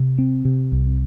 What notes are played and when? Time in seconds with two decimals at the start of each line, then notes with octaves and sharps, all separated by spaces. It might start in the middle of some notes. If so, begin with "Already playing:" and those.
Already playing: C3
0.18 C4
0.45 C3
0.72 C2